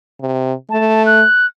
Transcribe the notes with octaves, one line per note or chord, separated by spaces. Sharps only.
C3
A3 A5
F#6